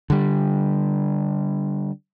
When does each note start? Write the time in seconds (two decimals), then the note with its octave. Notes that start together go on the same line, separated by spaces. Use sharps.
0.10 D3 G3